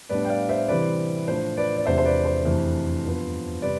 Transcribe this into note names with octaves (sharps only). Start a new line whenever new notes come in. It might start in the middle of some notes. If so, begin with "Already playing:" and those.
A2 G3 B3 D4 B4 D5
G5
D5 F5
C5 E5
C3 E3 G3 C4 B4 D5
A2 F3 A3 D4 C5
B4 D5
D5
E2 C3 F3 A3 D4 C5 E5
C5
B4 D5
C5
F2 C3 E3 A3 D4
G2 F3 B3
C3 G3 B4 D5